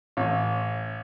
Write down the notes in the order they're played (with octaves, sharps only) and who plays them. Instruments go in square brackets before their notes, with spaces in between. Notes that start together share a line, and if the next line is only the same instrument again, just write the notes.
[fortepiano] A1